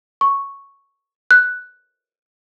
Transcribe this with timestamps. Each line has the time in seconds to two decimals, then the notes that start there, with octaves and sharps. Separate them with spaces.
0.21 C#6
1.31 F#6